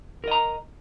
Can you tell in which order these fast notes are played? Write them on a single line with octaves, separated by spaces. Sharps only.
A#4 D#5 A#5